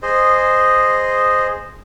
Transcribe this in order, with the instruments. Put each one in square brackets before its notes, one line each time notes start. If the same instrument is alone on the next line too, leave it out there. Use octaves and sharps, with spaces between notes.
[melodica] G#4 C5 D#5